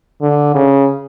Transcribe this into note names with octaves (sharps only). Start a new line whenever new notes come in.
D3
C#3